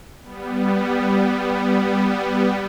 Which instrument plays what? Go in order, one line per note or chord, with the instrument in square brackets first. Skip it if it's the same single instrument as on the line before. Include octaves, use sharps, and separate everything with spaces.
[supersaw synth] G3 B3